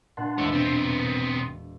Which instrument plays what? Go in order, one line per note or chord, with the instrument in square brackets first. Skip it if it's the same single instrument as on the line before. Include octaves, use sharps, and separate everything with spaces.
[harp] A#2 D4 F#6 [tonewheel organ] F#5 A5 C6
[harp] E1 C#6 [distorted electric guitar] E4 C#5
[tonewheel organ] B2 [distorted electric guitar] B3 C4